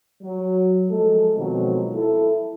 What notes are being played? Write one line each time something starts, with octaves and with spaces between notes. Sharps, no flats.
F#3
F3 G#3 A3 A4
B2 D#3 F3 F#3 G#3 C4
E4 A4